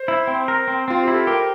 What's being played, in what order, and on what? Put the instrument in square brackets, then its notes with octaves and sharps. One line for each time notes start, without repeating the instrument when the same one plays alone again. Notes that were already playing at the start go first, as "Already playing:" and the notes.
Already playing: [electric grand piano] C5
[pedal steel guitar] E4
C4
A#4
C4
[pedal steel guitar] C4 [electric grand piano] F4
[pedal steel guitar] E4 [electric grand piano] G4
[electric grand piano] A4
[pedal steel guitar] G4 [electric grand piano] A#4